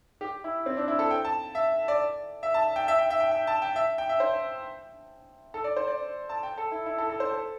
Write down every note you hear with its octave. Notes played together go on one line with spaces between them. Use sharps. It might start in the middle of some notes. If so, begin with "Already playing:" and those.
G4
E4
C4
D4
E4
A4
G5
A5
E5
D5
E5
A5
G5
E5
G5
E5
G5
G5
A5
G5
E5
G5
E5
C5
A4
D5
C5
D5
A5
G5
A4
E4
E4
A4
A4
C5
A4